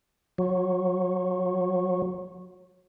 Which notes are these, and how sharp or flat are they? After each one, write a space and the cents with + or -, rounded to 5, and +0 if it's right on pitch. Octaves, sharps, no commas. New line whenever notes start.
F#3 -20